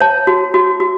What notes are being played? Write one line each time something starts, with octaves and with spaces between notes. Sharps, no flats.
C#5 A5
F#4
F#4
F#4